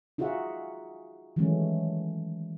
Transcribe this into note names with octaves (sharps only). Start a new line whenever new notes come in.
D#4 F4 F#4 G#4 E5 F#5
D#3 E3 F#3 G#3 A3 C#4